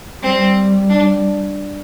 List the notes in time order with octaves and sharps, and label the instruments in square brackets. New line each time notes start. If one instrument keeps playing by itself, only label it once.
[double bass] G3 [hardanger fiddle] C4
[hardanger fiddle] D4